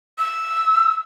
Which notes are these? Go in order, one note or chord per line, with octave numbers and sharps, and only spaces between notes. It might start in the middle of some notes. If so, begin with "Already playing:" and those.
E6